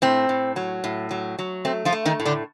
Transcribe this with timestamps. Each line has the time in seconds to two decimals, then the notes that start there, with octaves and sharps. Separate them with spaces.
0.02 A2 C4
0.29 A2
0.56 F#3
0.84 A2
1.11 F#3
1.39 F#3
1.65 A3 C4
1.85 F3 F4
1.93 A3
2.05 D#3 D#4
2.20 A2
2.25 D3 D4